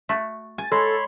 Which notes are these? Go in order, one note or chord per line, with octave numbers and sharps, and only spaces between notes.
A3 F#4
G#5 A6
G#3 A4 C#5 B5 C6